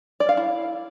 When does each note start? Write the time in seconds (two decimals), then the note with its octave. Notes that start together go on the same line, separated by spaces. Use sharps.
0.20 D5
0.29 F5
0.37 E4